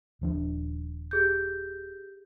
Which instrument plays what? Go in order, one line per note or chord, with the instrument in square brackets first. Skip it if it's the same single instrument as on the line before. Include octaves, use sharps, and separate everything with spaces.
[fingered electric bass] D#1 F3 D4
[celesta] G4 G#4 G6